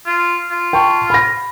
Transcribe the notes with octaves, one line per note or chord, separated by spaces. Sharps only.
F4
F4
G5 A5 C#6
B5 A#6